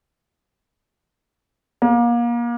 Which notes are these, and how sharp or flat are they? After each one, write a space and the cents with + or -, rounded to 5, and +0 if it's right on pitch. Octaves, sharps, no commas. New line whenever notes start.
A#3 +30